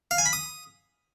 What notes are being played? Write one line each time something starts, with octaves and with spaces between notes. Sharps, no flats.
F5
G#5
B5
D#6